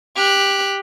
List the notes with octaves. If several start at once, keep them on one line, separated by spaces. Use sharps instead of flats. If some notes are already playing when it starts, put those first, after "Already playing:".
G4 F#6